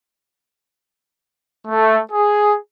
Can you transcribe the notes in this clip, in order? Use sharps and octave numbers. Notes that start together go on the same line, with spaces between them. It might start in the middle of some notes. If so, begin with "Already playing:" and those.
A3
G#4